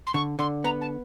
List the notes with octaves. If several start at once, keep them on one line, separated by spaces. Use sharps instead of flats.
C6
D3 C#6
D3 C6
B3 A#5
A5